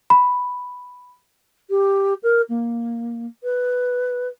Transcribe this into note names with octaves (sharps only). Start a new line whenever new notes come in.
B5
G4
A#4
A#3
B4